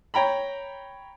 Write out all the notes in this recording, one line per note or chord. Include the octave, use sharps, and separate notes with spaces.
C#5 G5 A#5 B5